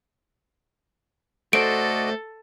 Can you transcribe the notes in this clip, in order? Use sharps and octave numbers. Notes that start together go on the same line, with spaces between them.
A3 F#4 A4 C5 D5 D#5 D7